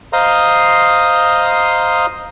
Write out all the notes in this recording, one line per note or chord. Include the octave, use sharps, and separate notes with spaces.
C5 D#5 F5 A#5 C6 D#6